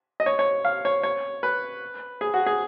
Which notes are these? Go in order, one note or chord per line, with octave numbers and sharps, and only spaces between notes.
D#5
C#5
C#5
F5
C#5
C#5
B4
G#4
F#4
G#4